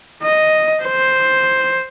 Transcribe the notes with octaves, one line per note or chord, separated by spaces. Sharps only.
D#5
C5